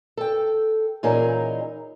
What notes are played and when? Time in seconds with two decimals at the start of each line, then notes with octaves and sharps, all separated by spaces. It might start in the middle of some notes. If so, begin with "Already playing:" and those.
0.17 A4 G5
1.03 A#2 E3 C#4 D#4 G#4 A#4